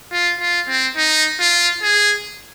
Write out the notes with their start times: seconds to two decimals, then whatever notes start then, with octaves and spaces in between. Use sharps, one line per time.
0.12 F4
0.40 F4
0.68 C4
0.97 D#4
1.40 F4
1.83 G#4